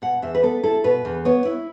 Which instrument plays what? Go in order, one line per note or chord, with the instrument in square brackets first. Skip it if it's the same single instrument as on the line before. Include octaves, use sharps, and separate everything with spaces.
[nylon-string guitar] B2 F#5
E2 E5
B4
B3 A4
E4 A4
B2 B4
E2
B3 C#5
E4